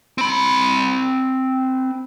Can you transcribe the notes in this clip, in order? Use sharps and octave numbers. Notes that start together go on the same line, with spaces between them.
C4 B5